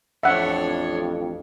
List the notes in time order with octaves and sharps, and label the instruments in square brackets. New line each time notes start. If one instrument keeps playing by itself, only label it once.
[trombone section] A1 F2 [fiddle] D4 C#5 [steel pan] E5 F#5